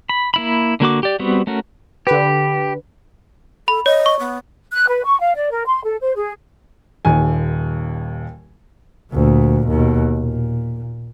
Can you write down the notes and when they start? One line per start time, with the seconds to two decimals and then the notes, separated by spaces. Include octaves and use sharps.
0.09 B5
0.34 A#3 E4 B5
0.80 D3 A#3 F#4 D6
1.03 G4 D5
1.19 G3 B3 C4 F#4
1.47 A3 C#4 F#4 A#4
2.07 D3 G4 B4
3.68 A4 B5
3.86 C#5 D#5
4.06 C#6
4.19 B3
4.73 F#6
4.88 B4
5.05 C#6
5.20 F5
5.35 D5
5.51 A#4
5.66 C6
5.84 A4
6.01 C5
6.16 G#4
7.05 D#1 D#2 G#5
9.12 D2 A#2
9.68 D#2 B2
10.17 A#2